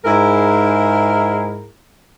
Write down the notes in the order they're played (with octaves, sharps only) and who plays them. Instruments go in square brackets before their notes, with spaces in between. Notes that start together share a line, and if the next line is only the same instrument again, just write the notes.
[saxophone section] G#2 E4 G#4 A#4